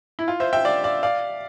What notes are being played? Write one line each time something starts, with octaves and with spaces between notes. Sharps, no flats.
E4
F4
C5 E5
E5 G5
D5 F5
D5 F5
D5 F5